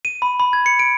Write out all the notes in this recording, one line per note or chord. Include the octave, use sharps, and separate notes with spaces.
D#7
B5
B5
G#6
C#7
D7